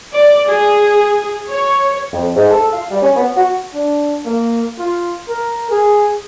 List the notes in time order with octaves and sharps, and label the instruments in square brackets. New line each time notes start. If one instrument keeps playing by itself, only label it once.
[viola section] D5
G#4
C#5
[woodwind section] F2
G#2
A4
F5
G3
C#4
B3
F#4
[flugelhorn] D4
A#3
F4
A#4
G#4